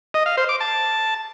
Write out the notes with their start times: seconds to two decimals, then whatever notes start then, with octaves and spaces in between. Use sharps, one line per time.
0.14 D#5
0.26 F5
0.37 C5
0.49 D6
0.60 A5